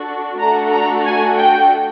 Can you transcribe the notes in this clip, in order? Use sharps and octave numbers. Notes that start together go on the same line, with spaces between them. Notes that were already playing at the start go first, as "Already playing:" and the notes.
Already playing: D4 F#4 A4
A3 D4 F#4 A4 A#5
A#5
G#5
G5